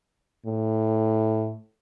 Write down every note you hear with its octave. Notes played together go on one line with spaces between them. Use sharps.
A2